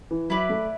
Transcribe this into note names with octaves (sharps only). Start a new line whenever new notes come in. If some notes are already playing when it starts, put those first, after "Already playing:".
E3
F#3 E4 B4 D5
A3